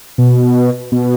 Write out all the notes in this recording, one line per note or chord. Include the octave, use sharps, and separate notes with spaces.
B2
B2